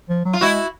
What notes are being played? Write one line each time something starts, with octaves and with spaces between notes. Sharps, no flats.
F3
F#3
F4
G#3 E4 F#4